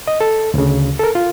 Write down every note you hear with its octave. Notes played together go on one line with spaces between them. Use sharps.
D#5
A4
D2 C#3
A4 A#4
F4